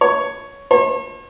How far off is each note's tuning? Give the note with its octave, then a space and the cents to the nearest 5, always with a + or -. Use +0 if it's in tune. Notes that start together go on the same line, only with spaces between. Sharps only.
C#5 +5
C#5 -40